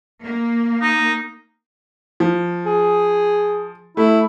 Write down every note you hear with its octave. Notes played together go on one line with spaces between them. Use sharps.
A#3
D#4
F3
G#4
A3 E4